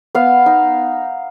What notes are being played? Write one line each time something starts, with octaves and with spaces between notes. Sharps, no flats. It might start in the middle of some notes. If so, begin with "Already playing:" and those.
B3 F5
D#4